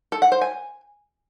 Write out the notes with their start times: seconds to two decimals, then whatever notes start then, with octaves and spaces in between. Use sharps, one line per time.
0.12 A4
0.22 F#5
0.32 C5
0.41 G#5